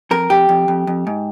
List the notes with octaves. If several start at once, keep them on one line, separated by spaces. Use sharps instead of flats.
F2 A#4
F2 G4
F2
F2
F2
G#2